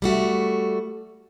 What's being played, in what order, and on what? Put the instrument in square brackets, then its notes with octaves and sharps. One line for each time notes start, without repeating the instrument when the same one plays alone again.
[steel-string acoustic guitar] G3 A3 F#4